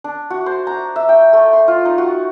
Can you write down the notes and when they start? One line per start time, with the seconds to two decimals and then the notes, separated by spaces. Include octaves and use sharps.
0.04 D4
0.30 F#4
0.46 C5
0.67 A#5
0.96 E5
1.09 G5
1.33 A3
1.53 C6
1.68 F4
1.85 D#4
1.98 F#4